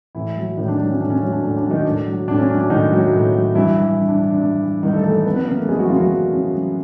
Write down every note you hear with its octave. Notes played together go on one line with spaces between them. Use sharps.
A2 E3 E4
F#3
A2 D#3 D#4
D4
F#3 D4
C#4
A2 D4
C#4
F#3
D4
A2 D4
D4
F#3
D#3 D#4
A2 D4
F#3
A2 D4
C#4
F#3 D4
D4
A2 D#3 D#4
F#3
A2
F#3
G2 E3 E4
E3
G2
D4
E3
D4
G2
E3
G2 D#3 D#4
A3 A4
E3 A3 A4
A3 A4
F#2 B3 B4
B3 B4
C#3 E3 A#3 A#4
A3 A4
F#2 G#3 G#4
F#3 F#4
C#3 E3 F3 F4
F#3 F#4
F#2
C#3 E3
F#2